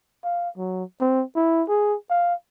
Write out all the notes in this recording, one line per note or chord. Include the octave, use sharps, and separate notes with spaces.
F5
F#3
C4
E4
G#4
F5